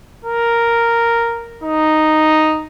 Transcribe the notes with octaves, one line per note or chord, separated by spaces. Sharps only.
A#4
D#4